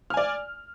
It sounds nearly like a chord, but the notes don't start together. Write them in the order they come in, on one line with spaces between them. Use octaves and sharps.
F6 G#5 D5